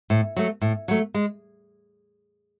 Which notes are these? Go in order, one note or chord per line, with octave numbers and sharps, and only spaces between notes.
A2
F#3 A3
A2
F#3 A3
G#3